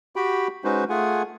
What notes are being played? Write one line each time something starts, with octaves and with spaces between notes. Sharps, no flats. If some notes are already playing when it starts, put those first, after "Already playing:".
F#4 G4 G5 B5
G#3 C#4 D#4 F#4 B4 C5
A3 F4 G#4 F#5 G#5